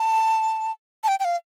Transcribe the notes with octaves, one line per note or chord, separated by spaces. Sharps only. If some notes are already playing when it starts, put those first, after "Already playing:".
Already playing: A5
A5
G5
G5
F5